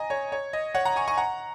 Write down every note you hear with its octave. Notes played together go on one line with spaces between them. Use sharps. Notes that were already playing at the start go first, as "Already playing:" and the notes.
Already playing: D#5 G#5 A#5
C#5
C#5
D#5
C#5 F#5
F#5 A#5
G#5 C#6
G#5 C#6
F#5 A#5